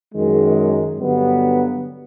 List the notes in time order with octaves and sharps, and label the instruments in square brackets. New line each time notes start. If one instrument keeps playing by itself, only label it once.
[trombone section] F#2 D#3 G#3
G2 D3 F#3 B3